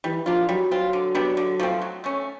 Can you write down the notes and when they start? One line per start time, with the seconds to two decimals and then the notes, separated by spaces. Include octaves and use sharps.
0.04 E3 G3
0.26 F3 A#3 D4 F4
0.49 F#3 G3
0.71 C4 F4
0.93 D3
1.15 G3 B3 D4
1.37 D3
1.60 F3 A3 C4
1.82 F#3
2.04 A3 C#4